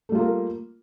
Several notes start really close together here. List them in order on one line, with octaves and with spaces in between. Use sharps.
A3 G3 F4 A#3 A#4